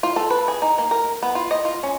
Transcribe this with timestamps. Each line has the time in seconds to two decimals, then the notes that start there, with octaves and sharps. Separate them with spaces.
0.03 F4
0.16 A4
0.30 B4
0.48 G#4
0.62 D#4
0.78 A#3
0.91 A#4
1.23 B3
1.35 F4
1.51 D#5
1.65 F4
1.83 C#4